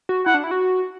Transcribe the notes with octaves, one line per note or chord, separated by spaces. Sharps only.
F#4
E4 F#5
D4
E4
F#4